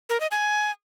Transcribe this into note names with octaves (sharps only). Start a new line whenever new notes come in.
A#4
D#5
G#5